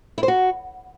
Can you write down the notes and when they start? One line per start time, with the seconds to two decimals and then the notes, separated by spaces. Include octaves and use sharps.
0.18 E4
0.23 C5
0.28 F#4